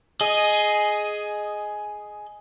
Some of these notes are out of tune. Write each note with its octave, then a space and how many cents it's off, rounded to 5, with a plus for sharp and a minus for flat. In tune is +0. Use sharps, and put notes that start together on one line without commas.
G#4 +10 D#5 +0